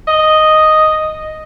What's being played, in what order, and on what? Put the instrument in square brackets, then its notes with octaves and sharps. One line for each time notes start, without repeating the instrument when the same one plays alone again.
[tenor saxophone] D#5